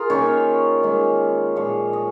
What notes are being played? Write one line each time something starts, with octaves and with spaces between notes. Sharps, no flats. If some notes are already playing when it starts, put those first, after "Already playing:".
Already playing: F4 G#4 A#4
D#3 A#3 C#4 C#5
D#3 G#3 C#4
A#2 F3 G#3 C#5
D#5